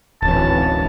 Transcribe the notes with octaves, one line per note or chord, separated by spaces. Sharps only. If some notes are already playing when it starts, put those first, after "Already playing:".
D1 G#1 E3 C#4 A5